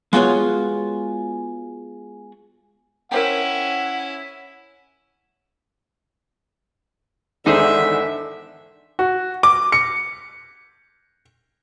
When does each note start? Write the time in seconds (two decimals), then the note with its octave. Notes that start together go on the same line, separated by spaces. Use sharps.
0.13 G#3 B3 F4 F#4 G#4 C#5
3.12 C#4 E4 A#4 C5 F#5 G5
7.46 E2 G#2 D3 D#3 D#4 G#4 C5 E5
8.99 F#4
9.43 D6
9.72 C#7